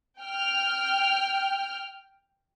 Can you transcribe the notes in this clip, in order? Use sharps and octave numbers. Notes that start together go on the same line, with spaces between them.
G5 F6